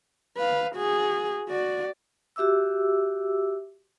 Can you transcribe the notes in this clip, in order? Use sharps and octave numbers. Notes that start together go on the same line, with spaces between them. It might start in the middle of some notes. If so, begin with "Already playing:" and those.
B4 F5
F#4 G#4
F#4 D5
F#4 G4 E5 D6 E6